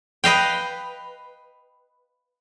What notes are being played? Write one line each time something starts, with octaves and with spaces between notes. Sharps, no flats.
B4 D#5 F5 G5